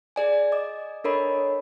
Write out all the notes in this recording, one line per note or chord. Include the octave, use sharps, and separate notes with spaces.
G#4 D5 G#5
D#5 D6
D4 A4 A#4 C#5 D#5 B5